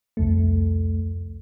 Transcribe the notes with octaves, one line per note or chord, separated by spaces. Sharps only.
C2 F2 A3